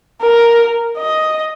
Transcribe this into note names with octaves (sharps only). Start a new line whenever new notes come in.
A#4
D#5